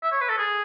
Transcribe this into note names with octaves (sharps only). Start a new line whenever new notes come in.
E5
C#5
B4
A4
G#4